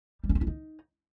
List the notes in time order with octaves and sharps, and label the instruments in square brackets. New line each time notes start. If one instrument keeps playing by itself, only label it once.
[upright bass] G3
C#4
C4
E4
D#4